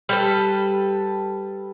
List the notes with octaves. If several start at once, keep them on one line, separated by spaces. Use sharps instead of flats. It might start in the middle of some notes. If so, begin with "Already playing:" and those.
G3 A4 B4